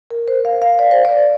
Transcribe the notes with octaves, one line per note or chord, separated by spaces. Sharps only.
A#4
C5
F5
F5
D5
C5
D5